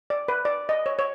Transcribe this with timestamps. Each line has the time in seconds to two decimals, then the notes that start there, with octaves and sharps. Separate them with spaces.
0.10 D5
0.28 B4
0.45 D5
0.69 D#5
0.86 C#5
0.99 C#5